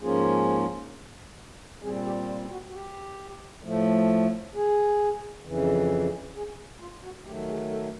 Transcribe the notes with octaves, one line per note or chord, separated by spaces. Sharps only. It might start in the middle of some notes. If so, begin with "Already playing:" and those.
G#2 F3 A#3 C#4 F4 G#4
A#2 G3 C4 G#4
G4
F4
F#4
F#4
G4
A2 F3 A3
G#4
F2 C#3 E3
G#4
F4
F#4
D#3 F#3 A3 G4
G#4
A4